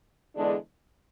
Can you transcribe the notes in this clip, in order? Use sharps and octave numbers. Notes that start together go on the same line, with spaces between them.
E2 D3 G#3 D4